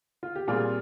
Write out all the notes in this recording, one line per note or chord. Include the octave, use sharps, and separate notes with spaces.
F4
G4
A#2 G3 C4 F4 G#4